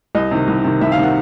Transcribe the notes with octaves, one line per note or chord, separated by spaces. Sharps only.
C2 D#5
C3 D#3
C2
C3 D#3
C2 E5
F5
C3 D#3
F#5